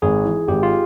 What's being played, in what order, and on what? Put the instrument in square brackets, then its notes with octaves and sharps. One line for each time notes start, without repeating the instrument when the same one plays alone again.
[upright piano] G#1 [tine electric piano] G#4
[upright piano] E3
[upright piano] G#1 [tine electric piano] G4
[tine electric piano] F4